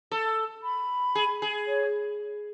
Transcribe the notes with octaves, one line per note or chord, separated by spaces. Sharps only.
A4
B5
G#4
G#4
C#5